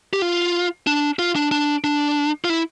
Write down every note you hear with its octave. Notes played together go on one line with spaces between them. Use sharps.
G4
F4
D4
F4
D4
D4
D4
F4
E4